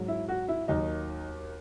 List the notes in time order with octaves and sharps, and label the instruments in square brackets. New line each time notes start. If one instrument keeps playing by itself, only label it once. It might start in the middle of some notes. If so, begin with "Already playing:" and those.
Already playing: [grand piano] G#2 F#3
E4
F#4
E4
D#2 D#3 F#3 D#4